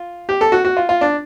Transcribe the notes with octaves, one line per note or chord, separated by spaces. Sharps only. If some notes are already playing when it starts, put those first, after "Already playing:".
Already playing: F4
G4
A4
F#4
F#4
F4
F4
D4